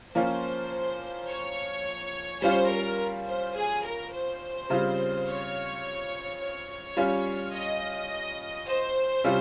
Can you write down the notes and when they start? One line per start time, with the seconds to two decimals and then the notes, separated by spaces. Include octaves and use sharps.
0.15 F3 A#3 C#4 F4 C5
1.29 C#5
2.42 G3 C#4 F4 C5
2.71 A#4
3.28 C5
3.56 G#4
3.85 A#4
4.13 C5
4.70 C#3 G3 C4 F4
5.27 C#5
6.40 C#5
6.97 G3 C#4 F4
7.54 D#5
8.67 C5
9.24 C3 G3 C#4 F4